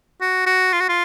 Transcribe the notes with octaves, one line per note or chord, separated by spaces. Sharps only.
F#4
F#4
F4
F#4
F4